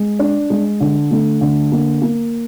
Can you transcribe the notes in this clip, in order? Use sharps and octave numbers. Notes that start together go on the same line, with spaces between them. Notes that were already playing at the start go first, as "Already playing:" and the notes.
Already playing: G#3
D4
G#3
D3
A3
D3
A#3
A#3